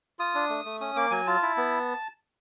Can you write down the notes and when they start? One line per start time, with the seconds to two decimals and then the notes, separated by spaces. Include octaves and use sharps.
0.19 F4 D#6
0.35 D4
0.50 A3
0.65 A3
0.81 C#4 D#6
0.96 A#3 D6
1.11 F#3 G#5
1.27 F4 A5
1.42 E4
1.57 B3